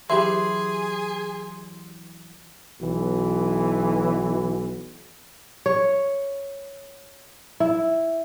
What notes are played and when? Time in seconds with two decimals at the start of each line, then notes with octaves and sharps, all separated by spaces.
0.10 E3 F#3 G4 G#4 B4 E5 C6
2.81 B1 E3 F#4
5.66 C#5
7.60 E4